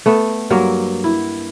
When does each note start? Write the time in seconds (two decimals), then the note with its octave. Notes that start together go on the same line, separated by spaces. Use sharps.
0.06 A3 B3
0.50 G2 F#3 A#3 A#4
1.04 E4